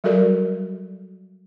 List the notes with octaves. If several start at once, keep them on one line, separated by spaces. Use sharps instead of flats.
F#3 G3 F#4 A4 A#4 D5